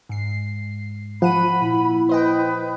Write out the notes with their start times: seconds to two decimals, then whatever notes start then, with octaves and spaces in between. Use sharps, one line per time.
0.09 G#2 C7
1.22 F3 F#5 B5 D#7
1.62 A#2 E4
2.09 B4 C5 D#5 G5